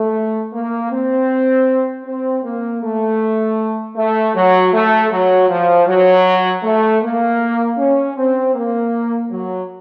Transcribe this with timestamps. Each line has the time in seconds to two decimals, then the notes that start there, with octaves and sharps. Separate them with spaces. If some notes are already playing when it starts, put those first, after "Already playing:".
Already playing: A3
0.53 A#3
0.91 C4
2.05 C4
2.44 A#3
2.82 A3
3.96 A3
4.35 F#3
4.73 A3
5.11 F#3
5.49 F3
5.87 F#3
6.63 A3
7.02 A#3
7.78 C#4
8.17 C4
8.55 A#3
9.31 F#3